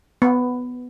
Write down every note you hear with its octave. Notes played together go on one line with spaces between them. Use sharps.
B3